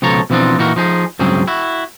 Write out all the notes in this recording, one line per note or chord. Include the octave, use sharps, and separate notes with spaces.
C#2 B2 F3 A4 C#5 A#5
B2 E3 F3 C4 D4 D#4
A#2 E3 D#4 F#4 A#4
F3 D#4 G#4
C#2 G2 F#3 C4 G#4
E4 F#4